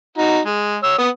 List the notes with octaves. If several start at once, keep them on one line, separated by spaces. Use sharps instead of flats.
D#4 F#4
G#3
C#5 E6
B3 D#6